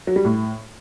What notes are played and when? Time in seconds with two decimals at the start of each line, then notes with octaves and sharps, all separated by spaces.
0.07 F#3
0.16 G3
0.25 A2